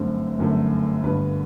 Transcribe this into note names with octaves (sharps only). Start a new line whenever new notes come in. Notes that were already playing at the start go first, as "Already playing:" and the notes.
Already playing: G1 F#2 D3 A3 C4
G1 F#2 D3 A3
G1 G2 D3 B4